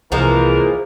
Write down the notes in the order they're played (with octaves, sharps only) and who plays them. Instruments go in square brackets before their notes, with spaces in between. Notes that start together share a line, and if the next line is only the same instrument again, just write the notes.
[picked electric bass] C2 [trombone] E3 [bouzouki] F3 G#3 A#3 [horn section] A#4